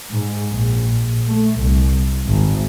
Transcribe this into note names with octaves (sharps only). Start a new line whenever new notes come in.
G#2
A#1
A3
C2
G#1